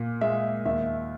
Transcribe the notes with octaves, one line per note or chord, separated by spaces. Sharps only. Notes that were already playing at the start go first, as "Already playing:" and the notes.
Already playing: A#2
G#3 E5
D#2 E5